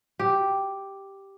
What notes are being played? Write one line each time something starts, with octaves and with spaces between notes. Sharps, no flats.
G4